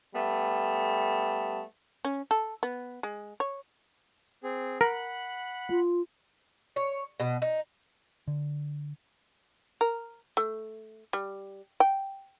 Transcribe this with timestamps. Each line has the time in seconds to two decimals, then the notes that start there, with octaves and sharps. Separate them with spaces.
0.14 G3 A3 B3
2.05 C#4
2.31 A4
2.63 B3
3.03 G#3
3.40 C#5
4.43 C4 G#4
4.81 A#4 F#5 B5
5.70 F4
6.76 C#5
7.20 B2
7.42 D#4
8.28 D3
9.81 A#4
10.37 A3
11.13 G3
11.80 G5